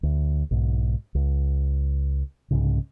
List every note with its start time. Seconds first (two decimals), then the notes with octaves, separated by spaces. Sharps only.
0.03 D2
0.51 B1 G#2
1.15 C#2
2.51 C2 G#2 C#3